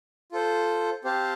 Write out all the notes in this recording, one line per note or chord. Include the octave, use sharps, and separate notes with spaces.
F4 A4 C5
C4 G4 C5 F5 A5